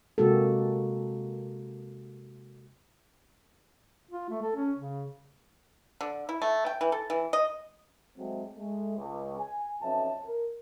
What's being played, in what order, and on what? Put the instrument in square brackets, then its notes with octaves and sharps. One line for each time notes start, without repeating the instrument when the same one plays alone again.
[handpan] C3 G#3 A#3 F#4 G4 A4
[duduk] F4
A3
A4
C#4
C#3
[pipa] D3
E4
A3
G5
E3
A4
E3
D#5
[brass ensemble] F#3 G#3 A3 C4
G#3 A3
C#2
G#5
B1 F2 B2 C#4 E5 A5
A#4